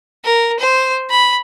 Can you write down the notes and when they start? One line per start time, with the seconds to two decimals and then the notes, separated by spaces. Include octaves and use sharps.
0.24 A#4
0.59 C5
1.10 B5